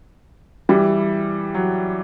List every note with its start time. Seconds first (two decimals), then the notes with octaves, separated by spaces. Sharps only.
0.69 E3 G3
1.54 F#3